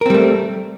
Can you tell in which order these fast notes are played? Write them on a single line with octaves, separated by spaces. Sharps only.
A#4 C4 G3 A3